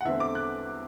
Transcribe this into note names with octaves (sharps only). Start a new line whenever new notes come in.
F#5
E2 D3 A3 C4 E5
D6
F#6